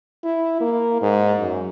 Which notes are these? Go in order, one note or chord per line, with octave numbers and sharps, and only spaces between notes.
E4
A#3
G#2
F#2